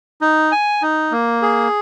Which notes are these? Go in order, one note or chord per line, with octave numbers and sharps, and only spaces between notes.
D#4
G#5
D#4
A#3
G#4